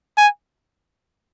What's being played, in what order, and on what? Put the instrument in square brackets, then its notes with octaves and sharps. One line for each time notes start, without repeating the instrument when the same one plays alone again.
[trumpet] G#5